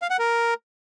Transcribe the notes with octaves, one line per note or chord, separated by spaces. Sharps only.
F5
F#5
A#4